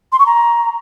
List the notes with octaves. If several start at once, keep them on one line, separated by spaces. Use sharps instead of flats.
C6
C#6
A#5